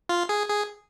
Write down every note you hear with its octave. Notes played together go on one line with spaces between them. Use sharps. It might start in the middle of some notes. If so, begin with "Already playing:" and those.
F4
G#4
G#4